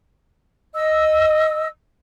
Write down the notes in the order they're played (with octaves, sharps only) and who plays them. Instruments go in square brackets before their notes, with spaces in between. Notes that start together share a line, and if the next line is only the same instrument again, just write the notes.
[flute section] D#5 E6